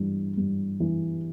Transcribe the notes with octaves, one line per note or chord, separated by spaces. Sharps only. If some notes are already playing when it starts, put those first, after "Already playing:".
Already playing: G2 E3
G2
E3